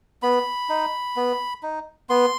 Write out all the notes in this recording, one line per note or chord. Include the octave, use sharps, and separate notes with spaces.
B3 B5
D#4
B3
D#4
B3 C6